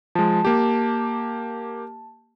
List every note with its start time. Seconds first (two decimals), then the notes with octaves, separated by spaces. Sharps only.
0.15 F3 G#3 A5
0.45 A#3 G4